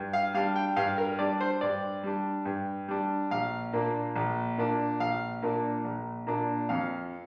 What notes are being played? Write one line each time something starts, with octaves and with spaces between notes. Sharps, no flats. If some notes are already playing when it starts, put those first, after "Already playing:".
Already playing: G2
F5
G3 D4 F5
G5
G2 F5
A#4
G3 D4 D5
C5
G2 D5
G3 D4
G2
G3 D4
A#1 F5
A#2 A#3 D4
A#1
A#2 A#3 D4
A#1 F5
A#2 A#3 D4
A#1
A#2 A#3 D4
F2 F5